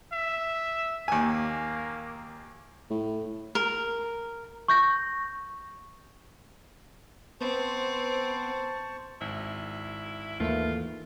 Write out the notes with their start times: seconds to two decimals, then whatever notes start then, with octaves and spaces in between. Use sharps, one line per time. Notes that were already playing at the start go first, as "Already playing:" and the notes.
0.12 E5
1.08 D#2 A#3 G#5
2.90 A2
3.55 A#4
4.68 C#6 G6 A#6
7.41 B3 C4 C5 A5 C#6
9.21 G#1 E4
10.40 D#2 E3 A3 A#3 E4 F4